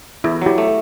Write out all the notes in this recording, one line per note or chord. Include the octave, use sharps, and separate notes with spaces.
E2 E4
F#3 E4 G4
A3